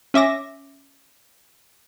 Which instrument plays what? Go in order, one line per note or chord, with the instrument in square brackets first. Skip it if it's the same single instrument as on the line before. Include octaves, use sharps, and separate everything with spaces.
[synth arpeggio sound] C#4 E5 D6 A#6